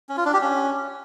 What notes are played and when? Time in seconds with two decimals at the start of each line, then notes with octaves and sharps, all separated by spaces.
0.09 C#4
0.17 F4
0.25 D4
0.33 G4
0.41 C#4